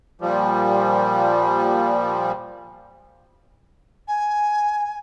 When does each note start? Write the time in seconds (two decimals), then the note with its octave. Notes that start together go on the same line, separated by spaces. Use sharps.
0.21 A#2 F3 G3
4.08 G#5